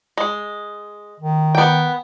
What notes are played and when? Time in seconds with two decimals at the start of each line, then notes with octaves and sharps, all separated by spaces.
0.17 G#3
1.20 D#3
1.55 B3 G5